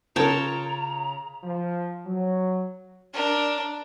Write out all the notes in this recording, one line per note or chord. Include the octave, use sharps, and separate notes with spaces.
C#3 F4 A#4 C#5 G5 A5 A#5
F3
F#3
D4 A#4